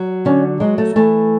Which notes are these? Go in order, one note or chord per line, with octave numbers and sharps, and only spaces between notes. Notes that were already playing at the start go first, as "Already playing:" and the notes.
Already playing: F#3
D3 C#4
F#3 G#3
A3
E3 A3